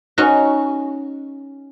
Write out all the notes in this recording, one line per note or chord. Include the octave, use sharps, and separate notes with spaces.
C#4 D#4 F#4